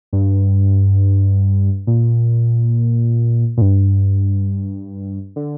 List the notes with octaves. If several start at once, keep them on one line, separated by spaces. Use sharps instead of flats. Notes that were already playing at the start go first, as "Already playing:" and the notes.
G2
A#2
A#2
G2
D3